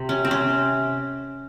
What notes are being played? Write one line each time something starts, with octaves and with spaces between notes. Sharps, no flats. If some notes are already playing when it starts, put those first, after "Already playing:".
Already playing: C3
C#4
C4
C#4